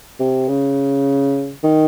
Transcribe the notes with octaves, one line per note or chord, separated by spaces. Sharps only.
C3
C#3
D#3